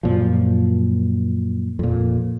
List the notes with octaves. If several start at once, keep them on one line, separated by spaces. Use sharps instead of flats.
F#2 A#2 F3
F2 A#2